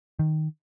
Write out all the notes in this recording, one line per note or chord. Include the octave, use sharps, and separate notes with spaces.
D#3